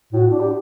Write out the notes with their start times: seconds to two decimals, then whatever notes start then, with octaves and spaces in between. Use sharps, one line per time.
0.13 A2 F#4
0.30 D4
0.40 G4